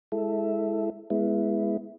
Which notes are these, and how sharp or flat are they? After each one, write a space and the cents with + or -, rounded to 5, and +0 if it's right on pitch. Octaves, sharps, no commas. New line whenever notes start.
G#3 +0 E4 +0 A4 +0
G#3 +0 B3 -10 E4 +5